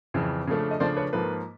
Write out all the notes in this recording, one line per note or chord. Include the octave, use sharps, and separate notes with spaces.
F2 C#3 E3
C#3 F3 A3 D4
D#5
C#3 F3 A3 D4 C5 D5
B4 C#5
G#2 F3 A#3 A4 B4